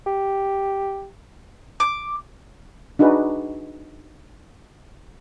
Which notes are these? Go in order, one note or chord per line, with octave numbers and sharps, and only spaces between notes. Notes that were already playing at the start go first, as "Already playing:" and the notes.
G4
D6
D4 D#4 F#4 G#4 B4